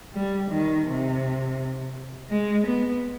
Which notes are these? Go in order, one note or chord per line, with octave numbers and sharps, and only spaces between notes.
G3
D#3
C3
G#3
B3